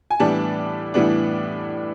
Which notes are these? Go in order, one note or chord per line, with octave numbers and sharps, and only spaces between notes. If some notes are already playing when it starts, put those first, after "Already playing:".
G#5
A2 E3 G3 B3 D4 A5
A2 E3 G3 B3 D4